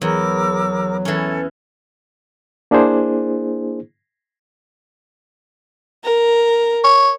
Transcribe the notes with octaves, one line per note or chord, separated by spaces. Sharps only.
E2 F#3 A#4 D6 E6
E3 C#4 A4
A#3 D4 E4 G#4 C5
A#4
C#5